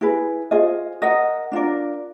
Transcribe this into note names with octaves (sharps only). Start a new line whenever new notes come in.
E4 G#4 B4
F4 G#4 C5 D#5
A#4 D#5 F#5
D4 F4 A#4 D5